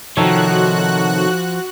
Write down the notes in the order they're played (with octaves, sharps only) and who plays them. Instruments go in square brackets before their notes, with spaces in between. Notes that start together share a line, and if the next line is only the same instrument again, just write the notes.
[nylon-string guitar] C3 D#3 [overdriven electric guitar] F3 [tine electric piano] D#4 A4 C#5 [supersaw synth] F#4 F#6